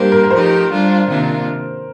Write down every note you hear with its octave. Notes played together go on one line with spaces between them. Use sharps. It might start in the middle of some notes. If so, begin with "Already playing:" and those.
Already playing: G3 A#3 D4 G4 C5
A#4
A#4
F3 A3 D#4 G4 C5
G3 D4 F4
C3 D#3 A#3 D4 F4